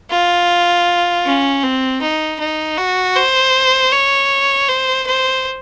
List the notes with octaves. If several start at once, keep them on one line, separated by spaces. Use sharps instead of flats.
F4
C#4
C4
D#4
D#4
F#4
C5
C#5
C5
C5